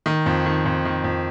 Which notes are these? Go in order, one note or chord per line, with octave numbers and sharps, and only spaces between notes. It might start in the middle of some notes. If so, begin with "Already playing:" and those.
D#3
F2
D#3
F2
D#3
F2